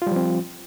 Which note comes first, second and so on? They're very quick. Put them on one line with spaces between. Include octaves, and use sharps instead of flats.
F4 G3 F3 C4